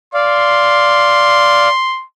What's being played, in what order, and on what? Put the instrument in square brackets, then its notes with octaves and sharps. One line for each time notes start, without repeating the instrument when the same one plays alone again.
[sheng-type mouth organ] D5 F5 [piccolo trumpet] C6